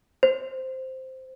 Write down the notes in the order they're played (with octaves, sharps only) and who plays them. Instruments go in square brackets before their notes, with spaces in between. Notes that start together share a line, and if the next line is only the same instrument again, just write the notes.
[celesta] C5